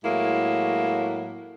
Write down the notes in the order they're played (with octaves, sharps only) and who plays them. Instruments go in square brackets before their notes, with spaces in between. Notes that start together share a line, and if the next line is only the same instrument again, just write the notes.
[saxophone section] A2 F#3 G#3 A#3 E4